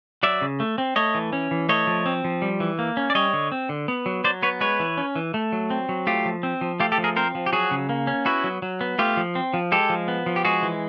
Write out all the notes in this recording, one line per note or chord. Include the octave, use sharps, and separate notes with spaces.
F#3 D5 E5
C#3
A3
C4
A3 C#5 D#5
E3
C#4
E3
A3 C#5 D#5
F3
C4
F3
G3
E3
A#3
C#4
D5
G3 C#5 D#5
D3
C4
D3
B3
F#3
F#3 C5 D5
B3 B4 C#5
G#3 B4 C#5
E3
C#4
E3
A3
F#3
C4
F#3
A3 F4 G4
F3
C4
F3
A3 F4 G4
G4 A4
F3
G#4 A#4
C4 A#4 C5
F3
G4
F#3 F#4 G#4
C#3
A#3
C#4
B3 E4 F#4
F#3
F#3
B3
A3 F4 G4
F3
C4
F3
G#3 G4 A4
F3
B3
F3
G4
G#3 F#4 G#4
E3